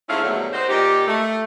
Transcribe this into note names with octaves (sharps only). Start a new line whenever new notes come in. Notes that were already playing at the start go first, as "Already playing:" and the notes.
G#2 D3 A3 C#4 E4 F5
G#2 B2 D#3 F#3 G3 A3
D#4 F#4 A#4 C5
A#2 D#3 D#4 G4
A3